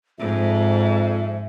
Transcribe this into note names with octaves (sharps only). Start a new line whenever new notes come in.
F2 G#2 E5